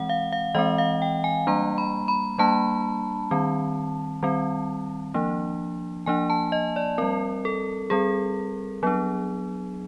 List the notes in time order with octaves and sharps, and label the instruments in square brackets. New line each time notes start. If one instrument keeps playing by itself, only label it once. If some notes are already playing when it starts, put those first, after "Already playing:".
Already playing: [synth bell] E3 G#3 C4 F#5
F5
F5
E3 G#3 C4 D#5
F5
G5
G#5
G3 A#3 D4 A#5
B5
B5
G3 A#3 D4 A5
D#3 G3 C4
D#3 G3 C4
F3 A#3 D4
F3 A#3 D4 G#5
A5
D#5
D5
G3 C4 A#4
A4
G3 C4 G#4
F#3 B3 D4